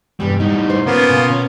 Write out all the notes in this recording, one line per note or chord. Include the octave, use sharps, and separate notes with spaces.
E2 G2 C3 G3
A2 G3 D#4
C5
C#3 A#3 B3 F4
B2
C#4